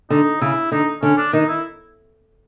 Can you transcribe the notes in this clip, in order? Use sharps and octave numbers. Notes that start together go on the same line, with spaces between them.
D3 D#4
C#3 E4
D3 D#4
D3 C#4
D4
D#3 D#4
E4